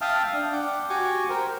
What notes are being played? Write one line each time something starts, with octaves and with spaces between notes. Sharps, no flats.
E5 F5 G5 A5 D#6 F6
D4
F#5 G5 D6
F#4 G4 G#5 C#6 D6
G4 A#4 C5